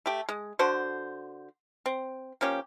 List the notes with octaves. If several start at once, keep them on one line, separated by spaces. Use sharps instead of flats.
A3 G4
G#3
D3 F#4 A4 C5
C4
F3 A#3 C#4 G4